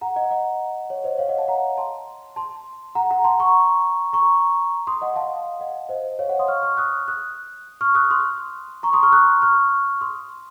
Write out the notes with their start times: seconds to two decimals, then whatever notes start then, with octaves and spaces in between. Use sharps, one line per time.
0.01 F#5 A#5
0.16 D#5 F#5
0.31 D#5 F#5
0.90 C#5
1.04 C5 D#5
1.19 C#5 F5
1.29 D#5 F#5
1.38 F5 A5
1.48 F#5 A#5
1.77 A5 C6
2.36 A5 C6
2.95 F#5 A#5
3.11 F#5 A#5
3.25 A5 C6
3.40 A#5 C#6
4.13 A#5 C#6
4.87 C6 D#6
5.01 D#5 F#5
5.16 F5 A5
5.60 D#5 F#5
5.89 C5 D#5
6.19 C#5 F5
6.29 D#5 F#5
6.39 C6 D#6
6.48 C#6 F6
6.63 C#6 F6
6.77 D#6 F#6
7.08 D#6 F#6
7.81 C#6 F6
7.95 D#6 F#6
8.11 C6 D#6
8.83 A#5 C#6
8.93 C6 D#6
9.03 C#6 F6
9.13 D#6 F#6
9.42 C#6 F6
10.01 C6 D#6